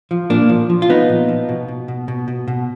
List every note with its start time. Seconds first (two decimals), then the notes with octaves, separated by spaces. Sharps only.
0.11 F3
0.30 A#2 A#3 D4
0.49 F3
0.70 F3
0.82 F4
0.89 F3 B3 D#4
1.09 A#2
1.28 F3
1.49 B2
1.68 B2
1.88 B2
2.08 B2
2.28 B2
2.48 B2